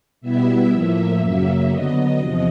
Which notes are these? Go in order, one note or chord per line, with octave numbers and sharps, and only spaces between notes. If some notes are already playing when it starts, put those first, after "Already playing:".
B2 G3 B3 E4 E5
A2 F3 A#3
F#2 C#3 F#3 A#3 E5
D3 F#3 B3 D#5
E2 C3 F3